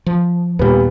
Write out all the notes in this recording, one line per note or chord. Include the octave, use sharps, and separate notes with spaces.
F3
D#2 A#2 G3 B3